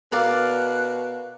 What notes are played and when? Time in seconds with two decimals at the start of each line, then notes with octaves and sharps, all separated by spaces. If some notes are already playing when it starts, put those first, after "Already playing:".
0.12 B2 A#4 D5 F5 F#6